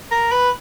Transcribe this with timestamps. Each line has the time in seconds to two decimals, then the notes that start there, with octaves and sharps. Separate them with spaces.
0.11 A#4
0.32 B4